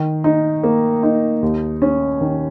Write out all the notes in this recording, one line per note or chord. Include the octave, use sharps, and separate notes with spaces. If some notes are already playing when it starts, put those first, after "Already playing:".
Already playing: D#3
D#4
A#3
D#4
D#2
C#4
D#3